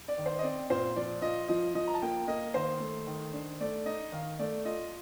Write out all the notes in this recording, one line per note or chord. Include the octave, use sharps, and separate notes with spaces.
D5
D#3
C5
D#5
C4 D5
A#2 C5
F3 D5
F4 D#5
F3 D#5
F3 D#5
A#5
A5
A#3 G5
A#3 D#5
D#3 C5
A3
D#3
D4
A3 D5
D#4 D#5
D#3 F5
A3 D5
F4 D#5